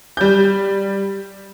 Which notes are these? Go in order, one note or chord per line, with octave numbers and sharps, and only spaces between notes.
G3 G6